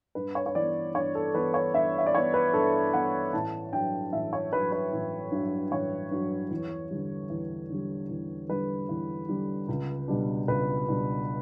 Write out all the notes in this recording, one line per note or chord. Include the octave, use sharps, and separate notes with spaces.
G2 B4
C#5
C#5
E3 B3 D5
G2 C#5
A4
E3 B3 B4
C#5
G2 E5
E5
D5
E3 B3 C#5
B4
G2 A4
E3 B3 F#5
A1 A5
G2 F#3 G5
A1 E5
C#5
G2 F#3 B4
B4
A1
G2 F#3
A1 C#5
G2 F#3
E2
D3 G3
E2
D3 G3
E2
D3 G3 B4
E2
D3 G3
C#2
B2 G3 D4
C#2 B4
B2 G3 D4